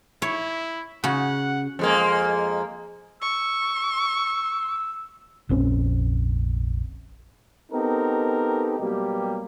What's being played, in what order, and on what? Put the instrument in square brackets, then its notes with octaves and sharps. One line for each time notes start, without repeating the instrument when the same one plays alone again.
[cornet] E4 [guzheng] C#5
[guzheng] C#3 F#4 [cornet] F#5
[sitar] F2 G#3 A#3
[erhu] C#6 [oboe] E6
[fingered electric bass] F1 A#1 C4 C#4
[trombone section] B3 C4 D#4 G4 A4 A#4
B2 F#3 G3 A#3 G4